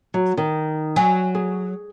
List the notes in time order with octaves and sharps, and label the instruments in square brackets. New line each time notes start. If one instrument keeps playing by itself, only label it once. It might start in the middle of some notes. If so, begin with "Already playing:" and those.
[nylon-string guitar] F#3
D#3
[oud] F#3 [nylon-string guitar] G#5
[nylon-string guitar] G#4